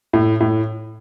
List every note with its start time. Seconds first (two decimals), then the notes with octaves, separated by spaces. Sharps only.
0.13 A2
0.41 A2